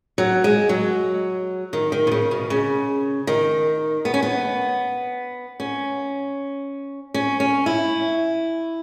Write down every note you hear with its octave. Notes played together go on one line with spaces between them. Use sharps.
F#3
G#3
F#3
D#3
D#3
B2
C#3
B2
C#3
D#3
B3
C#4
B3
C#4
C#4
C#4
E4